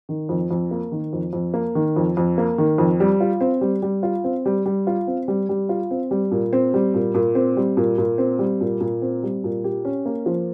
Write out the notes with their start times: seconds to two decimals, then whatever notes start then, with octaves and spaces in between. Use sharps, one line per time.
0.09 D#3
0.29 F2
0.51 F2
0.71 A#3
0.92 D#3
1.13 F2
1.33 F2
1.54 A#3
1.75 D#3
1.96 F2
2.17 F2
2.38 A#3
2.58 D#3
2.78 F2
3.00 G3
3.20 F4
3.41 C4
3.61 G3
3.82 G3
4.03 F4
4.24 C4
4.46 G3
4.66 G3
4.87 F4
5.07 C4
5.28 G3
5.49 G3
5.69 F4
5.91 C4
6.11 G3
6.31 A#2
6.53 C4
6.74 G3
6.94 A#2
7.14 A#2
7.35 C4
7.57 G3
7.77 A#2
7.98 A#2
8.18 C4
8.39 G3
8.61 A#2
8.80 A#2
9.02 C4
9.23 G3
9.44 A#2
9.64 G4
9.85 C#4
10.06 A#3
10.26 F3